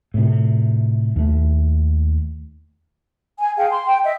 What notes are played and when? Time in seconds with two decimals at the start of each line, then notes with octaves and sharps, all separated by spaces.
0.14 A2 C3
1.16 D#2 A3
3.40 G#5
3.57 G#4 F5 G5 G#5
3.70 C6
3.85 G5
4.04 D#5 E5